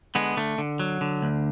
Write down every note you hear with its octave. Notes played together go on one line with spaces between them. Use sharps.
D3 G#3 B3
D3 A3
D3
F#3
D3
D2